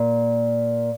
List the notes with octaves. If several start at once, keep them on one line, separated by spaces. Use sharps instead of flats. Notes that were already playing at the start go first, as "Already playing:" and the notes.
Already playing: A#2